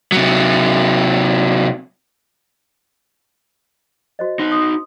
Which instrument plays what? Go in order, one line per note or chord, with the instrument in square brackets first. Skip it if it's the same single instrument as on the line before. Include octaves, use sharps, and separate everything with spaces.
[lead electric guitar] C3 F#3
[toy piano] F#4 C5 D#5
[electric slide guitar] D#4 F#4 [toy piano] C6
[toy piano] C6 D#6